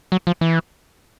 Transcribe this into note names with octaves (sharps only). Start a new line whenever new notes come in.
F#3
F3
E3